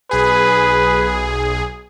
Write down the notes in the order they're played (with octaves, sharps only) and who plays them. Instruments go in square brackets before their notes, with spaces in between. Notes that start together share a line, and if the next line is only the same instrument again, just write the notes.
[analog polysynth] B1 G#4 [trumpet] B4